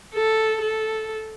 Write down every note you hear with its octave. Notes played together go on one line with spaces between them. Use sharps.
A4
A4